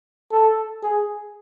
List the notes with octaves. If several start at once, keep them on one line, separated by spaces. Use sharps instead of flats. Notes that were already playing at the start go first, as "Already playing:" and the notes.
A4
G#4